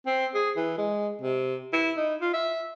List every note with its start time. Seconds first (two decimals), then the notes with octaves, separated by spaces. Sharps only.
0.06 C4
0.35 G#4
0.56 E3
0.78 G#3
1.21 C3
1.73 E4
1.97 D#4
2.21 F4
2.33 E5